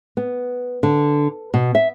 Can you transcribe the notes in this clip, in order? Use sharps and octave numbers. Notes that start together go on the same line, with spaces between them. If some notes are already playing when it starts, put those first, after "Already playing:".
B3
D3
B2
E5